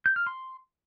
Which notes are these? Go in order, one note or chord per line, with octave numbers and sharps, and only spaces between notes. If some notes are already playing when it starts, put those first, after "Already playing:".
G6
F6
C6